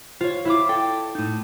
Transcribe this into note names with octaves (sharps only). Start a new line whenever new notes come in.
F4 C5 C#5
E4 F4 D6
A4 G5
A2 D#4